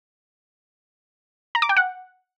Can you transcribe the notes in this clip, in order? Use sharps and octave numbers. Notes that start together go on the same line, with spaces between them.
A#5
D6
G5
F#5